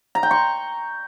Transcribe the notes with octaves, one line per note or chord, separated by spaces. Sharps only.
A#5
G5
C#6